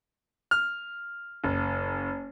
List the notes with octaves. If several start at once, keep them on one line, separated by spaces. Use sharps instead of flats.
F6
F#1